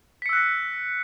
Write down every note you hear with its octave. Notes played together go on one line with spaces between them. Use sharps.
E6 F#6 A#6 B6 C#7